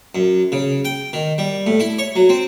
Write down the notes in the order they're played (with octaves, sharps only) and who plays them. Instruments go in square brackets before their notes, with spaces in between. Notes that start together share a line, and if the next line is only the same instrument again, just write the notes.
[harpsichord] F#2
C#3
G5
D#3
G3
A2
E4
C#5
F#3
C4